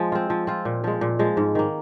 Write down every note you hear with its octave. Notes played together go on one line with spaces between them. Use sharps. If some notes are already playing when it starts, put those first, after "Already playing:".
Already playing: F3 G#3
C4 F4
F3
C4 F4
A#2
F3 G#3
A#2
F3 G#3
G#2
D#3 A#3